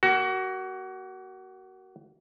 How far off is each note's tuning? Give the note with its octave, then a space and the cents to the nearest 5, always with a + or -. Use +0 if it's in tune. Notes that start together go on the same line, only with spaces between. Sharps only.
A#3 +0 F#4 +25